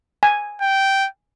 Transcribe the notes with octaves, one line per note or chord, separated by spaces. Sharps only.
G#5
G5